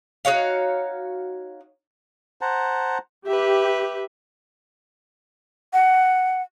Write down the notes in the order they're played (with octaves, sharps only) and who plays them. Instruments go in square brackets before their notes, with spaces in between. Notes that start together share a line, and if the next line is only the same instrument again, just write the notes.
[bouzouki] D#4 F#4 C#5 F5
[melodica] C5 F#5 A5 A#5
[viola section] G4 [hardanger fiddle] B4 E5
[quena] F#5